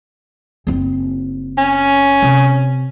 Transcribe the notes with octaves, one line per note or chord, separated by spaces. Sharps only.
F#1 C4
C#4
C3